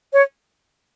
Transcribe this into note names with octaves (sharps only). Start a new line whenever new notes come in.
C#5